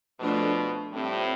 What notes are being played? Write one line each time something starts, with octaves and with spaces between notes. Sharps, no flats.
B2 F3 A3 D4 F4 A4
A2 G3 C4 F4